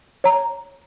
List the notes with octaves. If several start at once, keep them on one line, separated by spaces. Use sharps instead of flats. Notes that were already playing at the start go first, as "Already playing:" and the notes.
C#5 A#5